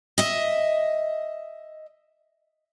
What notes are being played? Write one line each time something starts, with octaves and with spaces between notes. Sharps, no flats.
D#5 E5